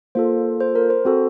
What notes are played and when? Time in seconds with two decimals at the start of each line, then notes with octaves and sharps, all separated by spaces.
0.15 A#3 F4 A4 C5
0.60 C5
0.75 A#4
0.90 C5
1.05 C4 F#4 A4